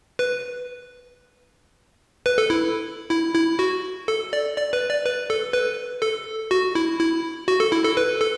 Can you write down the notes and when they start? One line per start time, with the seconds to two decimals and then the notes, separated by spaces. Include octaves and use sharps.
0.19 B4
2.26 B4
2.38 A4
2.50 E4
3.11 E4
3.35 E4
3.59 F#4
4.08 A4
4.33 D5
4.57 D5
4.73 B4
4.89 D5
5.05 B4
5.30 A4
5.53 B4
6.02 A4
6.51 F#4
6.75 E4
7.00 E4
7.48 F#4
7.60 A4
7.72 E4
7.84 A4
7.97 B4
8.21 A4